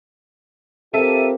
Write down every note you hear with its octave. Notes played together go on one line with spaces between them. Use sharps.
C4 F4 G4 A4 A#4 E5 D#7